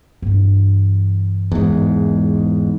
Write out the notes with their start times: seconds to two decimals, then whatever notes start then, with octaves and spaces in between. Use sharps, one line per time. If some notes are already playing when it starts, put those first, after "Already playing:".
0.22 G2 E3
1.52 E2 G#2